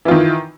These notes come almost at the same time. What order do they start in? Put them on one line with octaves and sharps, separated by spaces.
E3 F4 D#3